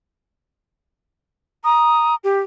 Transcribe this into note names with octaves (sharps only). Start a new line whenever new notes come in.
A#5 D#6
G4